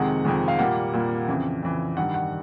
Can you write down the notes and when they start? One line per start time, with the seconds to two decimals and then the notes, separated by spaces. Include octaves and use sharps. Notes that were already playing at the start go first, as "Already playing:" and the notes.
Already playing: F2 C3 D#3 G#3 F#5
0.25 F2 C3 D#3 G#3
0.48 F5
0.59 A#2 G3 A#3 F#5
0.93 A#2 G3 A#3
1.28 F2 C#3 E3
1.62 F2 C#3 E3
1.97 G2 D#3 G3 F#5
2.14 F#5